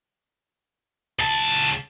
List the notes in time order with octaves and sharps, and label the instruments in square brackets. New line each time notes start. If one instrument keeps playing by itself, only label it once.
[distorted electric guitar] C#2 A5